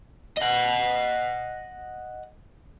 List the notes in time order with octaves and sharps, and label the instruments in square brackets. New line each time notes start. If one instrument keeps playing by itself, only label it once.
[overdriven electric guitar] D#5 F#5